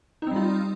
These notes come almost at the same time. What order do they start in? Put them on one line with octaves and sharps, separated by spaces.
D#4 C4 G3 F4